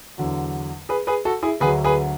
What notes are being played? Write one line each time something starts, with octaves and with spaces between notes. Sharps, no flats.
E2 D3 F#3
G#4 B4
G#4 B4
F#4 A4
E4 G#4
D2 D3 F#3 G#4 B4
G#4 B4